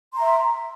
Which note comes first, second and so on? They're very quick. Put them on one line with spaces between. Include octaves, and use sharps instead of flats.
C6 A#5 E5